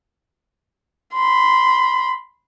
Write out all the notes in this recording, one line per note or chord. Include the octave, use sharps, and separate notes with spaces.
B5 C6